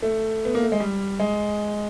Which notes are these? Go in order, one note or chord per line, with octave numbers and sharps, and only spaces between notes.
A3
B3
A#3
A3
G#3
G3
G#3